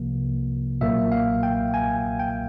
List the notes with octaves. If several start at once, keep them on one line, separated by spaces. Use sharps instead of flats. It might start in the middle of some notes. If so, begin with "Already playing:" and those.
Already playing: C2 C3 F3 A#3
B1 A#2 F#3 A#3 E5
F5
G5
G#5
G5